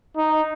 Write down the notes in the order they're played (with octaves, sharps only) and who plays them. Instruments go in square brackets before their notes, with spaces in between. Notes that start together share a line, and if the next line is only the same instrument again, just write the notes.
[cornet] D#4